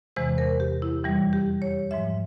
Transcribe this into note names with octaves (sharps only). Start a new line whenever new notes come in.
E2 C3 E3 G#3 C5
A#4
G4
E4
F2 E3 G3
G4
C#5
G#2 F3 G#3 E5